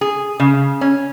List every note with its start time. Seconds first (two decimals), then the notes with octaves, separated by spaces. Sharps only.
0.01 G#4
0.40 C#3
0.81 C#4